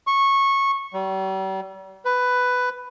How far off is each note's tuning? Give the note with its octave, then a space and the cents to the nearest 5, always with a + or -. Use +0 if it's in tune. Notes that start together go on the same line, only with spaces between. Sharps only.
C#6 -15
G3 -40
B4 +10